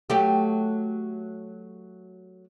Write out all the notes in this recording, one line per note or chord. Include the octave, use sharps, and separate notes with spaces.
F#3 A3 G4